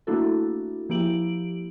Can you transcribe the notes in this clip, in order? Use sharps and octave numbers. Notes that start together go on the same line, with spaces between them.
A3 A#3 D4 E4 F#4 A4
F3 A#3 E4 G4 D7 F#7